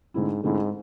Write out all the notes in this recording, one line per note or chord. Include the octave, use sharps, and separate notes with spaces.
G#2 D3 A3 C4 E4
G#2 D3 A3 C4 E4